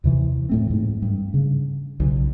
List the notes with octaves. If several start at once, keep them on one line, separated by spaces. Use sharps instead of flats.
D#2 C3 E3
A2 A3 C4
G#2
G2
C#3
B1 C#3